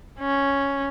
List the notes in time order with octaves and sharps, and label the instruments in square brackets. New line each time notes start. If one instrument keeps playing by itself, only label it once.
[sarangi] C#4